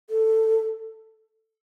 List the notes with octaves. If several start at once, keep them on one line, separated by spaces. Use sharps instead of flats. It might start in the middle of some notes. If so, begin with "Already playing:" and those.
A4